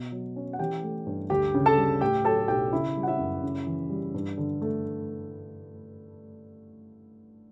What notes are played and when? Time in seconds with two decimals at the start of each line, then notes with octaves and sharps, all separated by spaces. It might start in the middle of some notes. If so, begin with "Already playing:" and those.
Already playing: B2
0.12 F#3
0.36 C#4
0.53 F#5
0.59 E3 G4 G5
0.83 A3
1.07 G2
1.30 D2 G4 G5
1.54 C#3
1.66 A4 A5
1.77 G3
2.01 A2 G4 G5
2.25 F#3 A4 A5
2.48 B1 G4 G5
2.73 C#3 E4 E5
2.97 G3
3.03 F#5
3.07 E4 E5
3.19 F#2
3.43 C#3
3.67 E3
3.90 G3
4.14 G2
4.38 D3
4.62 A3